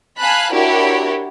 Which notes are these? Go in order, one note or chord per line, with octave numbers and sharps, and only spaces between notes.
F5 G#5 A5 B5 F#6
D4 E4 F#4 G4 A#4 C#5